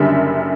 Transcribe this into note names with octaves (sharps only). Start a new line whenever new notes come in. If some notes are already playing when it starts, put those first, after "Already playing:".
Already playing: F#1 F#2 D3 G3 E5